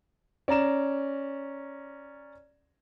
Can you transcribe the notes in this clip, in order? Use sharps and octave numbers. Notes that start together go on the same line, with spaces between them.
C#4 D5 A#5 E7